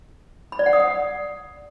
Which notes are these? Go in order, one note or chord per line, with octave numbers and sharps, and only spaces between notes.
B5
D5
F#5
D#6
F#5